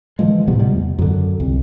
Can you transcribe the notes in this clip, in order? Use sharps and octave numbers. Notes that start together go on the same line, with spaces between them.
D3 E3 F3 G#3
A2 C3 G3 B3
C3 G3 G#3 B3
E2
F#2 D3
C2